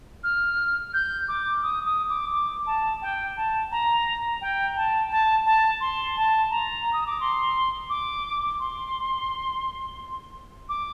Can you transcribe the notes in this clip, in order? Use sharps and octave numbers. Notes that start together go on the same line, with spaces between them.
F6
G6
D6
D#6
D#6
D6
D6
A5
G5
A5
A#5
G5
A5
A5
A5
C6
A5
A#5
D#6
D6
C6
D6
C6
D6